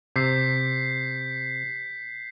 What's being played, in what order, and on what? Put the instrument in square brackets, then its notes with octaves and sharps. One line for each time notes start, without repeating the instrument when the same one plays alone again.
[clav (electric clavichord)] C3 [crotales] G6 B6 C7